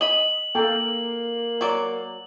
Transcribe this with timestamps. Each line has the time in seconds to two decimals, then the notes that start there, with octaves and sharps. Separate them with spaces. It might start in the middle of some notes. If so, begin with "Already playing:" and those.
0.01 D#5 B5 F#7
0.55 A#3 A4 G5
1.61 F#3 D5